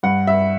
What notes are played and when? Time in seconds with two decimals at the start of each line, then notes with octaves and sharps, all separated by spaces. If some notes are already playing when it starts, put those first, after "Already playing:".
0.03 G2 F#5
0.27 G2 E5